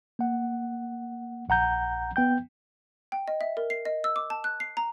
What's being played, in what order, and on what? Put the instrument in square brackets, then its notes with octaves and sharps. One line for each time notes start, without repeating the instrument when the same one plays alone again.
[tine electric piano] A#3 F#5
A#1 F#5 A#5 G6
B3 G5 G6
[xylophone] G5
D#5
E5
A#4
C7
D#5
E6
D6
A5
F#6
C7
A#5